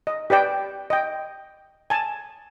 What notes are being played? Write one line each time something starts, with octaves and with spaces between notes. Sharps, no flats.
D#5
G4 B4 D5 G5
D#5 G5
G#5 A5